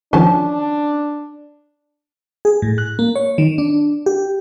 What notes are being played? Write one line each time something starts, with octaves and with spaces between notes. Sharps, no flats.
D#3 F3 C#4 D4 A5
G#4
A2
F#6
A#3
C#5
D#3
D4
G4